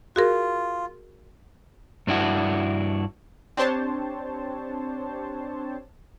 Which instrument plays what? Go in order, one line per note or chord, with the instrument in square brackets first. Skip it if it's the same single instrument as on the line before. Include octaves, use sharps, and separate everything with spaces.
[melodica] F4 [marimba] F#4 G#4 A#4
[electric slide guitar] G2 D4 E4 F#4
[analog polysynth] C4 D4 G4 C5 C#5 A5